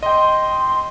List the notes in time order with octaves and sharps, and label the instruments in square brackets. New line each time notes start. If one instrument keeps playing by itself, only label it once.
[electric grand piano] D#5 G5 [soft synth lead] C6